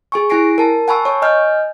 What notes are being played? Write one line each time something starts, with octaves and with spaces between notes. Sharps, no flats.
G#4 G#5 C#6
E4 G#5 A#6 C7 D7
A#4 A5
F#5 G#5 A5 B5 C#6 E6
C#5 C#6
D#5 G#5 F6 G6